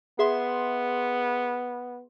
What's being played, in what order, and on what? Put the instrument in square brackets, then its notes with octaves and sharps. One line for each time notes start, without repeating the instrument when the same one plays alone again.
[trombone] B3 [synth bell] G#4 E5 C6